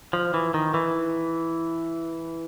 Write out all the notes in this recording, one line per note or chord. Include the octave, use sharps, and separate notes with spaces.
F3
E3
D#3
E3